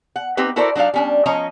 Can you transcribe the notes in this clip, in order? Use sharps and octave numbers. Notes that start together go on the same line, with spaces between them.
F#5
C4 D#4 G4 B4
E4 F#4 A4 A#4 C5 D5
F#3 D4 D#4 D5 F5
G3 C#4 D4
F3 C#4 C#5 D#5 A#5